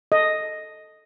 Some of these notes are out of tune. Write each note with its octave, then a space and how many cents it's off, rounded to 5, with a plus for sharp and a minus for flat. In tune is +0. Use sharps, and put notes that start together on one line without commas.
A4 +0 D#5 +0